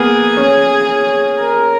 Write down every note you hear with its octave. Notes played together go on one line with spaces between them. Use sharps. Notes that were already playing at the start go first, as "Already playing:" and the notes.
Already playing: A#3 B3 G#4
C#4
A#4